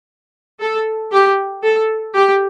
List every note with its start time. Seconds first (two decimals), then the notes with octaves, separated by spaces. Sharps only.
0.61 A4
1.13 G4
1.64 A4
2.15 G4